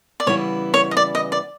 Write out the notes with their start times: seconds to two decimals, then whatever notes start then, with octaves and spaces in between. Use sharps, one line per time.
0.20 D5
0.26 C#3 E3 G3 B3 E4 C#5
0.74 C#5
0.91 D#5
0.97 D5
1.15 D#5
1.32 D5